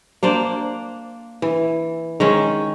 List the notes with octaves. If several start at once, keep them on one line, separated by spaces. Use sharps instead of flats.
A#3 D4 C5 D5
E3
D#3 G#3 C#4